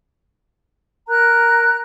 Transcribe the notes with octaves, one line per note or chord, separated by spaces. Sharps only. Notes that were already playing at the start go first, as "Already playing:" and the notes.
A#4 A#5 F#6